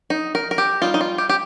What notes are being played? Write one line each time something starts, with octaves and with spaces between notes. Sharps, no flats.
D#4
A#4
A#4
G4
G3 D#4 F4
D#4
F4
G4
G4